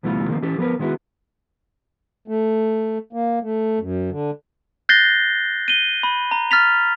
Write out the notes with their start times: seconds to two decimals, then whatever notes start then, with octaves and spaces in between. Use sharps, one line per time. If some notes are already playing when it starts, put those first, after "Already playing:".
0.03 D2 B2 E3 G3 A3 F4
0.28 D3 D#3 F3 F#3 A#3 C4
0.42 E3 C#4 G4 A4
0.58 F3 B3 A#4 B4
0.79 D#3 G#3 B3 E4 F#4
2.28 A3
3.13 A#3
3.43 A3
3.79 F#2
4.10 D3
4.89 F#6 G6 A6 A#6 C7 G7
5.68 D#7 G7
6.03 B5
6.31 A#5
6.51 F6 A6 B6 F7